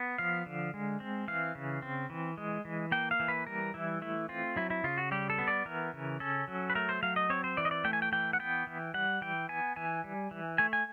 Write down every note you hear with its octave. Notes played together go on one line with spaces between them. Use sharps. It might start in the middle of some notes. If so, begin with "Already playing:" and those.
Already playing: B3
F3 F5
D3
G#3
C4
E3 F5
C#3
C4
E3
G#3
E3
A#3 G5
F5
E3
B4
G3 A#4
E3 E4
A3 E4
C4 F4
F#3 E4
E4
C#3 F4
F#4
G3 G4
A4
B3
D5
E3 A#4
C#3
C#4 A4
F#3
B4
A3 A#4
C5
F#3 F5
D#5
C4 C#5
C5
E3 D5
D#5
D5
A3 G5
G#5
G5
E3 G5
F#5
B3 G5
E3
G3 F#5
E3 G5
B3 G#5
E3 G#5
G3
E3
A3 G#5
G#5